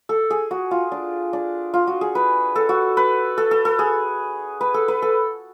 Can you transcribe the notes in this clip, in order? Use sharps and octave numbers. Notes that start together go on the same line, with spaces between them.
A4
G#4
F#4
F4
D4
D4
F4
F#4
G#4
B4
A4
F#4
B4
A4
A4
A4
G#4
B4
A4
B4
A4